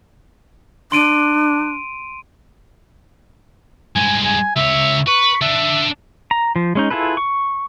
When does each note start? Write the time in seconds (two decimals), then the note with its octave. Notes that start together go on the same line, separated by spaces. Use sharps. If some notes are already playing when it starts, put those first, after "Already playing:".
0.92 D4 C6 D7 D#7
3.96 G2 G#3 G#5
4.25 G#5
4.56 C#2 C#5 E5
5.07 B4 C#6
5.42 D4 A4 E5
6.31 A#5
6.56 F3
6.75 G#3 C#4 D#4
6.90 E4 F4 G#4 A4 B4
7.17 C#6